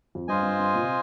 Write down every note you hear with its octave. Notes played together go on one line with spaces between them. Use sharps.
F2
G2 F4 C5 D#5 G#5
G2
G2
A#2
C3